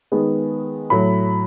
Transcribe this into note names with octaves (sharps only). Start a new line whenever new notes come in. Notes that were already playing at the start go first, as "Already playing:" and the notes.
D#3 G#3 B3
A2 F#3 A3 B5